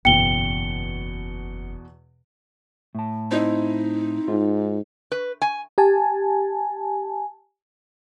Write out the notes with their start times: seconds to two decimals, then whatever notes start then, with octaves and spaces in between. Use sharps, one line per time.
0.05 F#1 E2 B2 B3 G5 C#7 G7
2.95 A2 A5
3.31 C4 D#4 E4 D#5
4.28 G#2 F4
5.12 B4
5.42 G#5
5.78 G4 G#5 A5